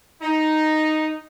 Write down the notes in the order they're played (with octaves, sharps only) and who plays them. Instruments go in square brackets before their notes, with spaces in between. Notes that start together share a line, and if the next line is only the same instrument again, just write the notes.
[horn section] D#4